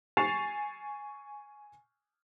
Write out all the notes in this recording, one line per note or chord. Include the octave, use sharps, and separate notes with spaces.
G#5 C#6 A6 C7 E7 F7